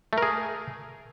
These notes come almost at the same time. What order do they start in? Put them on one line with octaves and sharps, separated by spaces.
A3 A#4 G#4